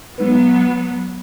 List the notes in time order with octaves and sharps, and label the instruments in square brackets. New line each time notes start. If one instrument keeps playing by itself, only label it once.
[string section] F#3 B3 [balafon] G#3 D#4 B4